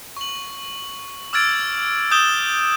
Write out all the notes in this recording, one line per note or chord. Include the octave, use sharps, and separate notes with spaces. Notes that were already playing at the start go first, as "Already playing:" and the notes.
C#6 F#7
D6 E6 F6 G#6 A6 D7
D#6 G6 E7 G7